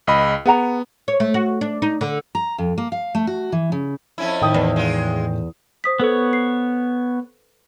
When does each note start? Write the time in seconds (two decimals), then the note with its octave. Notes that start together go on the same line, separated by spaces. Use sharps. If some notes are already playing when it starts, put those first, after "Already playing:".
0.07 C#2 D#5 B5
0.46 B3 G#4 F#5 A#5
1.08 C#5
1.20 A3
1.34 F#4
1.61 D4
1.82 D#4
2.01 D3
2.35 A#5
2.58 F2
2.78 A#3
2.92 F5
3.15 A3
3.27 F#4
3.52 E3
3.72 C#3
4.18 F2 C#4 E4
4.42 A2 D#3 G5 D#6
4.54 E2
4.76 G#3 F4
5.84 C5 D#6 B6
6.00 B3 A4 B4 C#5
6.33 C7